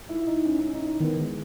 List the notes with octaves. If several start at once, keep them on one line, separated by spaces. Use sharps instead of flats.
E4
E4
D#4
C#4
C#4
D#4
D#4
D#3 B3
G#3